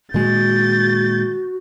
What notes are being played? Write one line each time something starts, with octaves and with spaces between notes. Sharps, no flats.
A#2 D#3 G#3 F#4 G6 A6